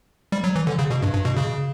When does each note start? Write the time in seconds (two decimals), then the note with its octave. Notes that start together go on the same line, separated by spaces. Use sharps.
0.32 G3
0.44 F#3
0.56 E3
0.67 D3
0.79 C#3
0.90 B2
1.02 G2
1.14 G2
1.25 B2
1.37 C#3